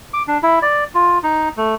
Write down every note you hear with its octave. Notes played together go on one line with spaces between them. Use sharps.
D6
D4
E4
D5
F4
D#4
A3